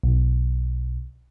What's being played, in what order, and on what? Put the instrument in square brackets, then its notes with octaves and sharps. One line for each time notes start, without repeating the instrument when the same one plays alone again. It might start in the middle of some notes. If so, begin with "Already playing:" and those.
[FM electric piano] B1